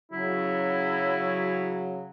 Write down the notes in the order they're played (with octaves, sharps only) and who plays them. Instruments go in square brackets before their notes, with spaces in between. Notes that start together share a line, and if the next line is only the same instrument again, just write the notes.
[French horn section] C#3 F#3 [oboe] E4